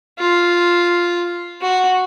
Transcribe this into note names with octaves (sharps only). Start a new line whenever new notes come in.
F4
F#4